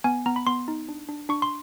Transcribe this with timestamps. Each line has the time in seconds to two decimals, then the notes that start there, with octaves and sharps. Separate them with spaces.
0.04 B3 G#5
0.26 B3 A#5
0.36 B5
0.46 B3 C6
0.68 D#4
0.89 D4
1.09 D4
1.29 D4 C#6
1.42 C6